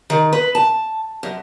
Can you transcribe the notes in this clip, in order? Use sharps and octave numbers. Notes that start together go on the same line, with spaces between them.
D#3
B4
A5
F#2